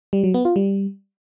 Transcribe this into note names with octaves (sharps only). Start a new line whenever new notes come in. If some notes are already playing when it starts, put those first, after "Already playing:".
G3
F#3
B3
F4
G3